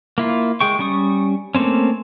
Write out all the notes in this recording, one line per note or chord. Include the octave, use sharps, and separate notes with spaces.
A#3 E4 F4
G#3 G#4 G5 C#6
G3 C#4 C#6 D#6
A3 A#3 C4 C#4